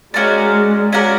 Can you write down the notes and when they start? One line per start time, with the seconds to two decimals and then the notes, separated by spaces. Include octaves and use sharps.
0.14 G#3 C#4 F#4 A#4 D5
0.93 C#4 F#4 A#4 D5